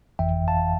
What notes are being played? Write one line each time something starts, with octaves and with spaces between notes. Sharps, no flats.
G1 F2 E3 E5 G5
F5 A5